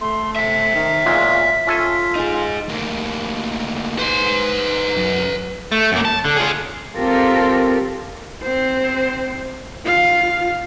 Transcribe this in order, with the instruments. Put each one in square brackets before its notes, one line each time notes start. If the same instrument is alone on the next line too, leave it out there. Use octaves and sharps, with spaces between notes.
[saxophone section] A3 [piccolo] C6
[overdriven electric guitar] E5 G5 [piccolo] B6
[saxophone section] D#3
[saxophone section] E2 F4 [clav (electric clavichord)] A#2 F#3 G#3
[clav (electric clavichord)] C#4 A4 G#5 [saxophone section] F4
[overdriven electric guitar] D#4 G#4
[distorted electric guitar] D2 A#3
[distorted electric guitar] D#4 C5 [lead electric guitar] B4 C6
[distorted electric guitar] F#2
[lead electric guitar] A3
F#2 A#3
A5
D3
F4 G#4
[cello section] C4 F4 G4 A4 A#4
[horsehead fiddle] C4 C5
F4 F5